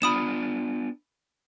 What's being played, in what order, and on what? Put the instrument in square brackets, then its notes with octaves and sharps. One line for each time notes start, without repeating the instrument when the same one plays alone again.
[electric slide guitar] B3 D4 F4 [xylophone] B5 D#6 E7